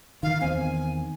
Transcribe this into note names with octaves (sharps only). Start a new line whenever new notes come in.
D#3 F5
E2 D#3 C4 G#5